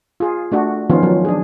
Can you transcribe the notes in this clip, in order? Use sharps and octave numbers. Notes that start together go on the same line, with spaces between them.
F4 G#4
A3 D4 F#4
D#3 F3 B3 C#4 F4
F#3
D4 G#4